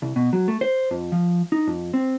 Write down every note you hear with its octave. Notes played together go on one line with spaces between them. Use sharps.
C2
B2
F#3
A3
C5
F2
F3
D#4
F2
C4